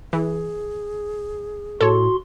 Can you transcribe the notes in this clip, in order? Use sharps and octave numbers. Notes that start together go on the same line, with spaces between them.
E3 G#4
A2 F#4 A4 C#5 C6